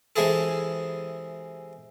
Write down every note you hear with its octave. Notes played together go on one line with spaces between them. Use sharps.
C3 E3 G#3 E4 G#4 A4